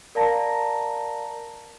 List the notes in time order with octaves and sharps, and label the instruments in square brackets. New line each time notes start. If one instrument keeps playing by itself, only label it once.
[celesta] A#4 D5 F5 A5 A#5 A#6